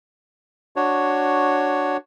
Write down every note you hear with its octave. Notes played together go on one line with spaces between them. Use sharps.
D4 F#4 C#5